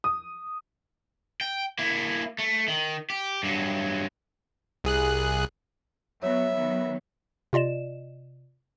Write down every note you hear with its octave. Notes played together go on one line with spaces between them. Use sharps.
D#6
G5
A#3 E4
A3
D#3
G4
G2 F#3
C2 G#4 F#6
F#3 B3 C#5 E5
D#3 F#3 B3
C3 F4 D5 D#5 E7